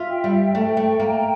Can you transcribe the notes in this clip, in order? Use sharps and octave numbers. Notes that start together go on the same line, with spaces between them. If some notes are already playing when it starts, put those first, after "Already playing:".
Already playing: F4 E5
G5
G3
A3 G5
A3
A#3 A#5